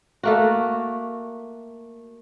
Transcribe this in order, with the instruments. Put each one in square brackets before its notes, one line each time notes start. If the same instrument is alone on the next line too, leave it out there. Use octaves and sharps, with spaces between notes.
[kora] A3 A#3 F#4